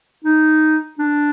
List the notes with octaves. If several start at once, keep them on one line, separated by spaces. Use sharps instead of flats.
D#4
D4